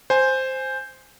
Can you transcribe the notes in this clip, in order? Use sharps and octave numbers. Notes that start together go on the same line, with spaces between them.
C5 G#5